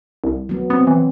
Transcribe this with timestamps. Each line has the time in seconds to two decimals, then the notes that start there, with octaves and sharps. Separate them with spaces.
0.24 C2
0.49 F#3 B3
0.70 B3 C4
0.87 E3